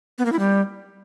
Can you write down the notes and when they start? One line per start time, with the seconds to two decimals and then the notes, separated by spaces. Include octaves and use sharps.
0.19 B3
0.25 A#3
0.32 E4
0.39 G3